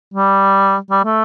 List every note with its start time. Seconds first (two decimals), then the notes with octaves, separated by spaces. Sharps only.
0.14 G3
0.90 G3
1.04 A3